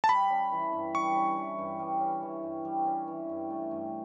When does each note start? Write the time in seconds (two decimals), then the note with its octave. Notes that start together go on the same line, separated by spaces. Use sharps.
0.04 A5
0.09 G3 B5
0.30 C#4
0.52 E3
0.72 G2
0.94 G3 C#6
1.16 C#4
1.37 E3
1.58 G2
1.79 G3
2.01 C#4
2.22 E3
2.43 G2
2.65 G3
2.86 C#4
3.08 E3
3.29 G2
3.50 A3
3.71 G2